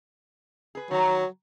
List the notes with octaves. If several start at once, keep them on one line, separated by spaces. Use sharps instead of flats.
G#4 B4
D#3 F#3 A#5